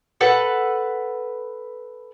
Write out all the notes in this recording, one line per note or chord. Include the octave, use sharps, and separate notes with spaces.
A4 B4 F#5